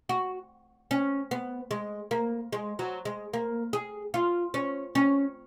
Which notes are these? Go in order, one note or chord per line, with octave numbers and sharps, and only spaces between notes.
F#4
C#4
B3
G#3
A#3
G#3
F#3
G#3
A#3
G#4
F4
C#4
C#4